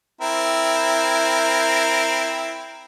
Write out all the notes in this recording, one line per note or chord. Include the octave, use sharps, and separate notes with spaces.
C4 E4 A#4